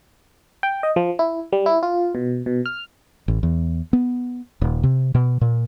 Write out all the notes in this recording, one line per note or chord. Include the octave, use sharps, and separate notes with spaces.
G5
D#5
F3
E4
G3
E4
F4
B2
B2
F6
A1
E2
B3
D#1
C3
B2
A#2